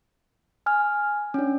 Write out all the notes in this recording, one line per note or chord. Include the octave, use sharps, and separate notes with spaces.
G#5 F6
C#4 D4